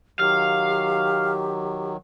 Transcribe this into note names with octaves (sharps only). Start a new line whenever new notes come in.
D#3 F#3 G4 F5